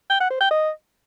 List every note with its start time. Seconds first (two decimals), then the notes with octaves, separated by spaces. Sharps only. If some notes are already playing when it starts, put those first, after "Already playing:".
0.09 G5
0.20 F#5
0.30 C5
0.40 G5
0.50 D#5